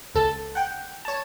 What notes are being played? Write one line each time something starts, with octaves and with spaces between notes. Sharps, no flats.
C#2 A4 A5
F#5 G5
C#5 A5